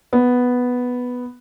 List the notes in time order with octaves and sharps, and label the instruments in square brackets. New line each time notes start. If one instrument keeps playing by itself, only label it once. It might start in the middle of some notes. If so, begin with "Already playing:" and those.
[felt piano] B3